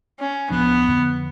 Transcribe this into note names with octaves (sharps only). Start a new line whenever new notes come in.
C#4
D1 F3 B3 D4
F2 D3